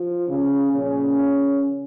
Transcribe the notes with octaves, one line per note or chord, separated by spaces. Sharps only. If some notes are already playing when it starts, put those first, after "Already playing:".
Already playing: F3 F4
C#3 C#4
A#2 C#3 F3 A#3 C#4